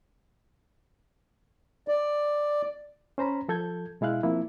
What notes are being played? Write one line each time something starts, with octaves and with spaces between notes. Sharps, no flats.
D5
C#4 C5 A#5 B5
F3 A4 G6 G#6
B2 G#3 E4 F5 F#6
F3 A#3 C4 E4